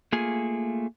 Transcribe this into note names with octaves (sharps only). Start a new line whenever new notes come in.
A3 A#3 F4 G#4 G#5